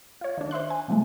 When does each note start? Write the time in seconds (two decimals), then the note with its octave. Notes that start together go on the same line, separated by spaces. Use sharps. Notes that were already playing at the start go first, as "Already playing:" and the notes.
0.21 F4 C#5
0.38 D#3 D4
0.51 C5 E5 C6 F#6
0.70 G#5
0.88 C3 F3 G#3 A3